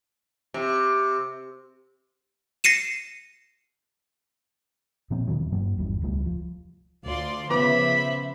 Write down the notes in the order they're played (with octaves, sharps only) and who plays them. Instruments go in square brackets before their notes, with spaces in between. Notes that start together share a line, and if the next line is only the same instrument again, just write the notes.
[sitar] C3
[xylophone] A#6 C7 C#7 D#7 E7
[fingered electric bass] A#2 F3 A#3 C4
E2 B2 D#3 F#3
G2 F#3 A#3
G1 E2 G3
E1 C#2 G3 A3
F3
[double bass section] D2 [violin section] F4 D5 C6
[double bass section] C#3 F3 [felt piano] B3 D6 [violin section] C5 E5 [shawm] B5